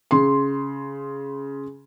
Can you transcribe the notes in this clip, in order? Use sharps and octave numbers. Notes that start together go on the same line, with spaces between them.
C#3 C6